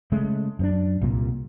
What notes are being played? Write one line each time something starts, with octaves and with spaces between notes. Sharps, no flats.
C#3 G#3 A3
F#2 C4 D4
C2 A#2